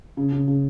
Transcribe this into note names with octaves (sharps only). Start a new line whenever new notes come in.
C#3
C#3
C#3